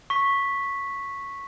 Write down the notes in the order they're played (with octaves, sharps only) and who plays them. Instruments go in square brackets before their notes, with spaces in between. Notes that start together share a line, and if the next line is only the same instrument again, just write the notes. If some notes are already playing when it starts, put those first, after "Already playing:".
[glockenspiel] C#6 B6